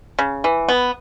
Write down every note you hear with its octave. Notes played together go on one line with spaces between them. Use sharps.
C#3
E3
B3